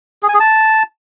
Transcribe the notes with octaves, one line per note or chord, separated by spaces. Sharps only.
G#4
G#5
G#4
A5